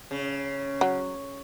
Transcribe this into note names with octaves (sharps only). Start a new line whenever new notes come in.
C#3
F#3